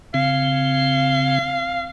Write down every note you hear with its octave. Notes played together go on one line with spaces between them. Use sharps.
C#3 C4 F5